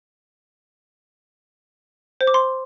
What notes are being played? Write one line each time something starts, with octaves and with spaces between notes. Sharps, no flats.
C5
D6
C6